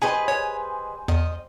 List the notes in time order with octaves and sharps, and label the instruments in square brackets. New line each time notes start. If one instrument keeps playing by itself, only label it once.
[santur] G3 C5 [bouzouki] G#4 B4 D#5 [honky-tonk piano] G#5
[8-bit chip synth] C#5
[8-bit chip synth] E2 [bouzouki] D#5